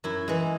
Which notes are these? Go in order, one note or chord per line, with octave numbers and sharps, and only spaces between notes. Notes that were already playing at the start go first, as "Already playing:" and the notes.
F#2 E4
E3 G#3